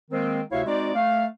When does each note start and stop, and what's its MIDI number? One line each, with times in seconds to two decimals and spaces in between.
0.11 0.41 51
0.11 0.41 56
0.11 0.41 58
0.11 0.41 60
0.51 0.62 38
0.51 0.62 48
0.51 0.62 64
0.51 0.62 73
0.51 0.62 76
0.51 0.62 77
0.66 0.94 56
0.66 0.94 60
0.66 0.94 63
0.66 0.94 66
0.66 0.94 74
0.95 1.26 57
0.95 1.26 77